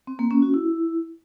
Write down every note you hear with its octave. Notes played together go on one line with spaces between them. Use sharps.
C4
A#3
C#4
F#4
E4